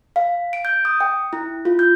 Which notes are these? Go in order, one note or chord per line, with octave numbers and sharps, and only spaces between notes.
F5
D7
G6
D#6
G5
E4
F4
G6